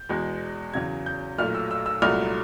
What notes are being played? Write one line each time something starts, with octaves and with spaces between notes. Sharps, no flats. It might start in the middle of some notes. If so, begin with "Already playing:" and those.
Already playing: G6
E2 B2 G#3
E2 C#3 F#3 G#6
G6
B1 A#2 F#3 A3 F6
E6
E6
E6
C2 A#2 F#3 A3 F6